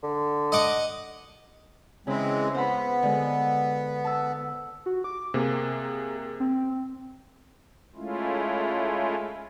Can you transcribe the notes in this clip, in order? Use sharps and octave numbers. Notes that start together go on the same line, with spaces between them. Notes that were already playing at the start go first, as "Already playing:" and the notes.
D3
D#5 F#5 D6
C#3 E3 G#3 C4 E4
B3 C5 F5 B5
D3 G#3
A5 E6
F#4
D6
C3 A#3 G#4
C4
G#3 A3 C#4 E4 F4